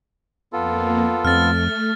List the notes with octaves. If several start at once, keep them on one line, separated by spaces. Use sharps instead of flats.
F2 A#3 B3 F4 A4
F2 A3 F6 A6